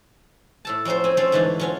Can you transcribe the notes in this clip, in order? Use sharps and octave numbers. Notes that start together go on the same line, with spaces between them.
A2 A4 A5
F2 F#3 C#4 A4 C5
C4 G#5
C4 C#4 F4 A4 C5
G#2 D3 E3 A3 C#4 D4
F#3 C#4 F4